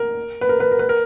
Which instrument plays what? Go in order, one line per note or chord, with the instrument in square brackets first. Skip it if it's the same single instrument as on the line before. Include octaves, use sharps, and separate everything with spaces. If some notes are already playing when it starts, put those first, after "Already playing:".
Already playing: [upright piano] A#4
B4
A#4
B4
A#4
B4
A#4